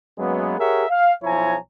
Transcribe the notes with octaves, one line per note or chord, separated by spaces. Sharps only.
F#2 F#3 G#3 A#3 B3
G4 G#4 A#4 C#5 E5 F#5
F5
B1 F3 E4 C#5 G#5 A#5